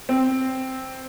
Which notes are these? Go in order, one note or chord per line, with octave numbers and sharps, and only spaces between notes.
C4